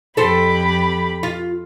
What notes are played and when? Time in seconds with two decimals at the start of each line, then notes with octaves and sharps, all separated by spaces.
0.17 F2 G4 A4 C5 B5
1.23 F4